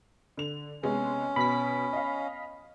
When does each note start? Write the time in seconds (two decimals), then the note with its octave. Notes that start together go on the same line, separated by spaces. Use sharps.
0.37 D3 F7
0.83 C3 G#3 B3 C#4
1.36 B2 B5 B6
1.93 D#5 F5